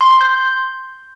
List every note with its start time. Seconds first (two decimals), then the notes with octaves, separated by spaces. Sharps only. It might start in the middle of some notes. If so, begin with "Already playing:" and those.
0.01 C6
0.11 C6
0.21 G6